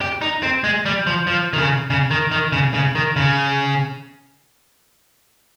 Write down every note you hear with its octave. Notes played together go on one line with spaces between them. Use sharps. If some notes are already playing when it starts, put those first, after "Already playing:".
G4
D#4
C4
G#3
G3
F3
F3
D#3
C#3
C#3
D#3
D#3
C#3
C#3
D#3
C#3